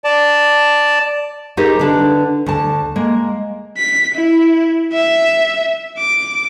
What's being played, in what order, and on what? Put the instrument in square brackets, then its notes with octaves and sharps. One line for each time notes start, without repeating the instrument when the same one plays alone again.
[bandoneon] D5 A5
[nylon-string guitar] D#4 G4 G#4 A#4 C5 D#5
D3 D4 B4
D2 A5
G#3 A#3
[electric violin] B6
E4
E5
D6